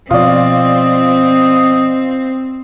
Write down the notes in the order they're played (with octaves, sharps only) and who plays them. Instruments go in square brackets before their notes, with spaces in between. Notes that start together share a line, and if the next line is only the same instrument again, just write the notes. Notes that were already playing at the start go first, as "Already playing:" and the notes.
[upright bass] B2 F3 [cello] C4 [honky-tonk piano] F4 D5 [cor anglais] D#5